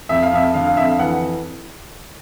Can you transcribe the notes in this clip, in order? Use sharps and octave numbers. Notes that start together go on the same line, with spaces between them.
F2 E5
F5
F2 E5
D3 F5
F5
F2 E5
F5
E3 F#5